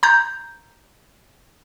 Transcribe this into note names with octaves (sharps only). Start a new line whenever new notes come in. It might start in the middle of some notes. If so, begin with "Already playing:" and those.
A#5 G6